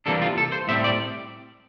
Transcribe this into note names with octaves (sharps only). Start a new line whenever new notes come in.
C3 E3 G3 A#3 D4 A4
F4
A4
C5
A2 G3 C4 E5
D5